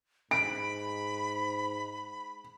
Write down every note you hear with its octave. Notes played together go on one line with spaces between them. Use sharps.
G#2 B5 D7